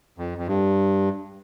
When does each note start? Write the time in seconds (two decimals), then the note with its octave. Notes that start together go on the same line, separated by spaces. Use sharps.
0.18 F2
0.38 F2
0.47 G2